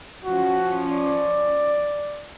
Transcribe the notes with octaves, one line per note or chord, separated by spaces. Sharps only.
F3 C#4 F#4
D5